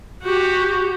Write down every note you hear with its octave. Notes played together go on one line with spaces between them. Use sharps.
F#4 G4